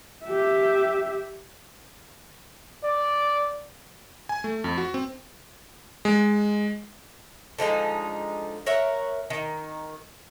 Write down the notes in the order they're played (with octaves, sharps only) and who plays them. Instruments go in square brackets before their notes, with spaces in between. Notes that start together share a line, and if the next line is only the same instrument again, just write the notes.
[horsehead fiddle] G4 E5
[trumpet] D5
[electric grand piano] G#5
A3
F2
F#4
C4
G#3
[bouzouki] D3 F3 G#3 D#4
A#4 C#5 E5 F#5
D#3